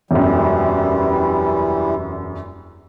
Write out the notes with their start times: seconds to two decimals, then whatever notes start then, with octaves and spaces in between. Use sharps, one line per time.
0.11 E1 F#2 E3 G3